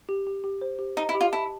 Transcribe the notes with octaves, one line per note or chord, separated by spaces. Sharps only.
G4
G4
G4
C5
G4
D#4 D#5
E4
G4
F4
E4 A5